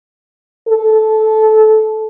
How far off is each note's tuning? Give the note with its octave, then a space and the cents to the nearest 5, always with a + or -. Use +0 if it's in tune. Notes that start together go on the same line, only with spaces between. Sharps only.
A4 -15